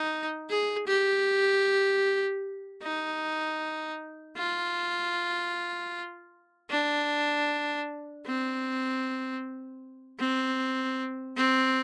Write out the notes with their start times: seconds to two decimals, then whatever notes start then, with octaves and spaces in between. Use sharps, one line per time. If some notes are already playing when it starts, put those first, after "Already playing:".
Already playing: D#4
0.50 G#4
0.87 G4
2.83 D#4
4.37 F4
6.70 D4
8.26 C4
10.20 C4
11.37 C4